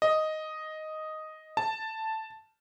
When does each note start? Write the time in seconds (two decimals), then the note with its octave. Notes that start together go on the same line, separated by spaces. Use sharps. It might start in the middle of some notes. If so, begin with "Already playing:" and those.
0.02 D#5
1.57 A5